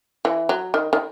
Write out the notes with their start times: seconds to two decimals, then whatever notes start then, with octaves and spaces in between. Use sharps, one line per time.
0.25 E3
0.49 F#3
0.74 D#3
0.93 D#3